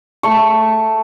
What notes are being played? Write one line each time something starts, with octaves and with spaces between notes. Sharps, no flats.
A3 C#6